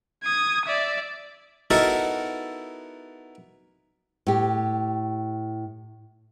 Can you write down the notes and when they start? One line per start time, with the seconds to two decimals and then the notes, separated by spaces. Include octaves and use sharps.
0.24 D#6 G#6
0.66 D5 E5
1.70 B3 D#4 E4 F#4 A4 A#4
4.27 A2 G4